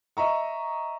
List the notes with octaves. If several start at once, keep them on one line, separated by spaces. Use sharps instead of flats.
D#5 E5 A#5 C#6